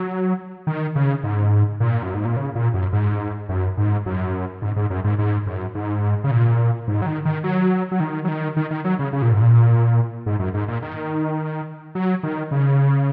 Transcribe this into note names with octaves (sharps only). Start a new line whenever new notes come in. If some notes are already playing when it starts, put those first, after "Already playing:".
Already playing: F#3
D#3
C#3
G#2
A#2
F#2
G#2
A#2
C#3
A#2
F#2
G#2
F#2
G#2
F#2
G#2
G#2
F#2
G#2
G#2
F#2
G#2
C#3
A#2
G#2
F#3
D#3
D#3
F#3
F#3
D#3
F#3
D#3
D#3
D#3
F#3
C#3
C#3
A#2
G#2
A#2
G#2
F#2
G#2
A#2
D#3
F#3
D#3
C#3